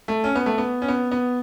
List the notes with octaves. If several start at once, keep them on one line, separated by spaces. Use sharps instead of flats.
A3
C#4
B3
A3
B3
C#4
B3
B3